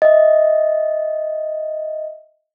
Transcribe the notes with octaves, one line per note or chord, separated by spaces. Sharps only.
D#5 E5